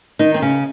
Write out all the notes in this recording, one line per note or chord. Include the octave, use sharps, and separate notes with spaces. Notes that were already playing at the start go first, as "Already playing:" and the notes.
D#3 D#4
C4
C#3 C#4